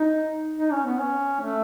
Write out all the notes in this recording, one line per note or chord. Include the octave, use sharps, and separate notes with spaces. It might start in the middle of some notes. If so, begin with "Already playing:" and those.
Already playing: D#4
D#4
C#4
B3
C#4
A3